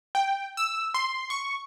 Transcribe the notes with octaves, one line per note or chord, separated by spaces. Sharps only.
G5
E6
C6
C#6